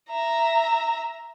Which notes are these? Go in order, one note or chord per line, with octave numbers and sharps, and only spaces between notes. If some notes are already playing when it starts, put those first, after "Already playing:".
E5 A#5